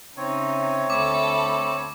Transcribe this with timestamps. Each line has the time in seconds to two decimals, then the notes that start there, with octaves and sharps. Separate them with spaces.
0.17 C#3 C4 D#4 C#5 E5
0.90 D2 A4 B5 D6